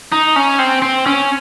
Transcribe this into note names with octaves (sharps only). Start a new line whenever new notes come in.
D#4
C#4
C4
C4
C#4